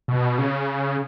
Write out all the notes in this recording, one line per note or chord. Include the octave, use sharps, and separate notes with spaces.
B2
C#3